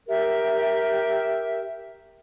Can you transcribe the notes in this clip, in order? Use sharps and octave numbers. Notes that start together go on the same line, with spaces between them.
G4 A#4 E5